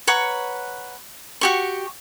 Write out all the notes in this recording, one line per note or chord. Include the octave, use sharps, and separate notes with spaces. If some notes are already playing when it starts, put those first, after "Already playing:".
B4 C#5 F#5 A#5
F#4 G4 C#6